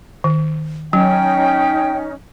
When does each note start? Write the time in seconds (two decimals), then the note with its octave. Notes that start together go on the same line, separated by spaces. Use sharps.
0.24 D#3
0.93 F#3 C#4 D#4 G5